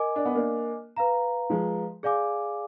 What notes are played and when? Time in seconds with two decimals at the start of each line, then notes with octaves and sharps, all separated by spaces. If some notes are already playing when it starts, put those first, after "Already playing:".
Already playing: A#4 D#5 G#5 D6
0.16 D4
0.25 B3
0.35 A#3 D4
0.97 B4 F5 A#5
1.50 F3 G#3
2.03 G#4 D5 F5 G#5 D6